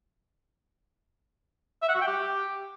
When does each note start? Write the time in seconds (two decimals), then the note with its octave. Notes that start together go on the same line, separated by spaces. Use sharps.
1.82 E5
1.89 F#5
1.95 F#4
2.01 G5
2.07 G4